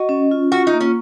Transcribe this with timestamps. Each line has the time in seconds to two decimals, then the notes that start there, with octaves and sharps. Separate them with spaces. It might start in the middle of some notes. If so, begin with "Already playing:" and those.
Already playing: F#4 D#5
0.09 C#4
0.31 F4
0.52 F4 F#4
0.67 D#4
0.74 A#3
0.80 C#4